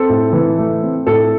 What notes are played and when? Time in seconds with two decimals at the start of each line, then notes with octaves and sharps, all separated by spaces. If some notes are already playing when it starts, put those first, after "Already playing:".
Already playing: C4 A4
0.09 A2
0.33 E3
0.58 A3
0.82 C4
1.07 A2 A4